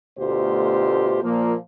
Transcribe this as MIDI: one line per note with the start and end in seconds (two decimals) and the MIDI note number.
0.19 1.20 38
0.19 1.20 47
0.19 1.20 57
0.19 1.20 65
0.19 1.20 67
0.19 1.20 72
1.23 1.55 46
1.23 1.55 53
1.23 1.55 58